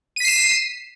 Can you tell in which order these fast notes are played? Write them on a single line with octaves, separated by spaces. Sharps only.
D#7 B6 C7 E7